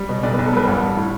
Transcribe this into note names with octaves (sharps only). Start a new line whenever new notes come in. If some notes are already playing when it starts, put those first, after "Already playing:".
Already playing: G3
B2
B1 D5
B4
B1
A4
G3 B4
B4
A1 A4
G3
A2